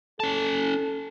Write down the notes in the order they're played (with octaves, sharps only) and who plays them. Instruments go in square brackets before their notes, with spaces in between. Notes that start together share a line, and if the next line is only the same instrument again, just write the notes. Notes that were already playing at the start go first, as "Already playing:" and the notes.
[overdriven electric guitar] C#4 A5 [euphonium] A4